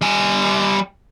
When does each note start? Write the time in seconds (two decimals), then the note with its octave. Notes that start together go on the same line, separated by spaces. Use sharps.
0.01 G3 G#5